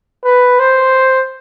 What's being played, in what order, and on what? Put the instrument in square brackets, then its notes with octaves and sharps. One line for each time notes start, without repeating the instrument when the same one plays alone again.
[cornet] B4
C5